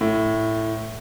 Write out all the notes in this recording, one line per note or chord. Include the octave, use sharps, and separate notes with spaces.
A2